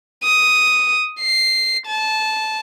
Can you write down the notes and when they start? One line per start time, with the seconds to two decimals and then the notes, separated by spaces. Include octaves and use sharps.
0.24 D#6
1.20 C7
1.86 A5